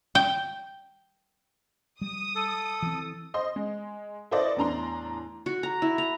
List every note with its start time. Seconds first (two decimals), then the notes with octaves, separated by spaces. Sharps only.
0.15 G5
2.01 G3 D#6
2.35 A4
2.82 E3 C4
3.34 C5 D#5 C6
3.56 G#3
4.31 E4 A4 B4 C5 D5 D#5
4.57 E2 A2 D4 A#5 C6
5.46 F#4
5.63 A#5
5.82 E4
5.98 A#5